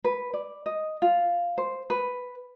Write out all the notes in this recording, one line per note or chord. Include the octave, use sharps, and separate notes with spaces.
B4
D5
D#5
F4
C5
B4